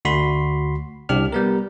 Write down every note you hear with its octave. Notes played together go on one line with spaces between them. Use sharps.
D2 F#4 B5 C6
C2 D4 G4 F6
G3 B3 A#4